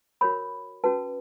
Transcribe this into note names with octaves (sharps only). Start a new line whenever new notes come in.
F#4 A#4 C#5 B5
C#4 F#4 B4 A5